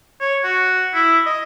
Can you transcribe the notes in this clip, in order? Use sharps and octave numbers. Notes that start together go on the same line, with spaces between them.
C#5
F#4
E4
D#5